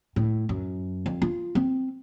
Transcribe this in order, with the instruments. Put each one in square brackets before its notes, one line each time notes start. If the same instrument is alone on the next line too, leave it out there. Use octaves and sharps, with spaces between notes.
[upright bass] A2
F#2
F2
F4
C4